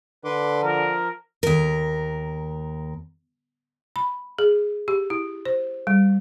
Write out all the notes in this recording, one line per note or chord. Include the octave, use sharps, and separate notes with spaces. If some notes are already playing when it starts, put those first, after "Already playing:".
D3 B4 C6 D6
F3 A#4
D#2 A#4
B5
G#4
G4
E4
C5
G3